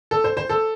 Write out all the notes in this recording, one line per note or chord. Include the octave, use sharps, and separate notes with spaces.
A4
C5
C5
A4